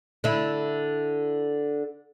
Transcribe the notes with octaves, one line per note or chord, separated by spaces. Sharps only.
D3 E4